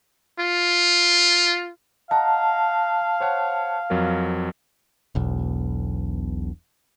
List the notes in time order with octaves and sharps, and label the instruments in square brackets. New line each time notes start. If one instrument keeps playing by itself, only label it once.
[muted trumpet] F4
[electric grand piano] D#5 F#5 A#5 [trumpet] F5 [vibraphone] A5
[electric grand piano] C5 C#5 F#5
F2 F#3 A#4
[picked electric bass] E1 B1